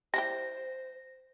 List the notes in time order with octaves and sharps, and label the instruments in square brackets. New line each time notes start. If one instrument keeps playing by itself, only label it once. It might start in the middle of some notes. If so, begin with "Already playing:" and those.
[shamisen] G3 E4 G4 [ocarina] C5 [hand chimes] A#6